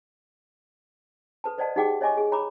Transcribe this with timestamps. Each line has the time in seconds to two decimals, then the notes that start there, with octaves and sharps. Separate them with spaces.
1.44 A4 B4 A5
1.58 A4 C5 D5 D#5 F#5 A5
1.76 D#4 G4 G#4 F#5 G5 D6
2.01 C#5 D#5 E5 G#5 C#6 D6
2.17 G#4
2.32 C#5 A#5 B5 D6